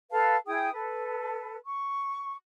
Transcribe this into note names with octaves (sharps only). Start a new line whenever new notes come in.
A4 B4 F5 A5
E4 G#4 G5 D#6
A4 B4
C#6